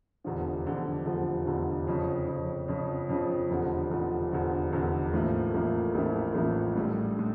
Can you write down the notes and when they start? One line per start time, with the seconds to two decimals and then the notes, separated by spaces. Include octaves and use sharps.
0.24 F1 E2 D3 F3
0.66 F1 E2 D3 F3
1.05 F1 E2 D3 F3
1.46 F1 E2 D3 F3
1.87 F2 C#3 F3
2.27 F2 C#3 F3
2.68 F2 C#3 F3
3.09 F2 C#3 F3
3.50 F1 E2 D3 F3
3.91 F1 E2 D3 F3
4.31 F1 E2 D3 F3
4.72 F1 E2 D3 F3
5.13 A1 A2 F3 A#3 E4
5.54 A1 A2 F3 A#3 E4
5.94 A1 A2 F3 A#3 E4
6.34 A1 A2 F3 A#3 E4
6.75 A#1 A2 G3
7.19 A2